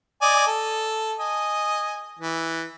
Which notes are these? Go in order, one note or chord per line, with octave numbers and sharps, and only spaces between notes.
D5 D#5 G#5
A4
D#5 G#5
E3